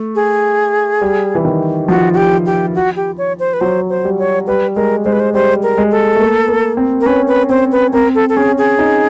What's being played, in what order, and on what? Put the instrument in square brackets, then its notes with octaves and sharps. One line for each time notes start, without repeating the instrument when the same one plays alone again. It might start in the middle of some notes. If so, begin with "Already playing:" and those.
Already playing: [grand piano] A3
[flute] G#4
[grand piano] G3
E3
D#3
[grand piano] F3 [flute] F#4
[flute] F#4
G4
G4
F#4
G4
C#5
C5
B4
[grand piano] F#3 [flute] C5
[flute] C5
[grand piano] G3
[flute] C#5
[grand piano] G3 [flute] B4
[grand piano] G#3 [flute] A#4
[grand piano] G#3 [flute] C5
[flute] B4
C5
[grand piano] G3 [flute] C5
[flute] A#4
[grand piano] G#3
[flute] A4
[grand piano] A3
A#3
A#3
C4
[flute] A#4
[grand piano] C#4 [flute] B4
[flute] B4
[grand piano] C4 [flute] C5
[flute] B4
[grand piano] C4 [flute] A#4
[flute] A4
A4
[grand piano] C#4 [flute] G#4
[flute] G#4
[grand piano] D#4